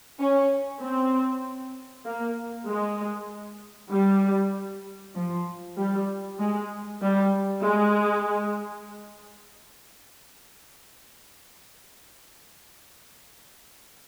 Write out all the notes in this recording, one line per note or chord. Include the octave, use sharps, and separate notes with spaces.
C#4
C4
A#3
G#3
G3
F3
G3
G#3
G3
G#3